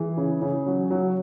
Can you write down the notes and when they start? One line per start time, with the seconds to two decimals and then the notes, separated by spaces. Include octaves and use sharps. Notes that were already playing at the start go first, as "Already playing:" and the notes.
Already playing: E3 G#4
0.17 C#3
0.42 C#3
0.66 F#3
0.91 F#3